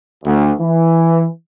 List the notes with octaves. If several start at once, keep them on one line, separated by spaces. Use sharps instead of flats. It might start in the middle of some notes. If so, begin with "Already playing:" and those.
D2
E3